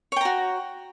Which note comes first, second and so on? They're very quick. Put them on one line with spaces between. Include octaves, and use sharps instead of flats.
C#5 G5 A#5 F#4